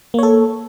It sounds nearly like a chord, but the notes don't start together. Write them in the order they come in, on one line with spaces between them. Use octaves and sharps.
A#3 C#5 A4